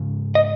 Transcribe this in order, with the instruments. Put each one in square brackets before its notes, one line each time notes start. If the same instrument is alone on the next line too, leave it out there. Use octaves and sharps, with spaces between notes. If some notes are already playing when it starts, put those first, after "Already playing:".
Already playing: [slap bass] G#2 C#3
[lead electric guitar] D#5